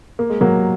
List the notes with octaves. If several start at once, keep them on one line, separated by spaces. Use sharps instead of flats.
A#3
G#3
F#3 A#3